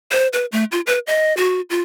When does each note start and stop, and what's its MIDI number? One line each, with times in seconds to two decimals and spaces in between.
0.11 0.28 72
0.33 0.46 71
0.52 0.64 57
0.72 0.81 65
0.87 0.99 71
1.07 1.35 75
1.37 1.61 66
1.70 1.83 65